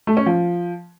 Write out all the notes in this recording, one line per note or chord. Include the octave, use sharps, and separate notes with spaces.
A3
C#4
F3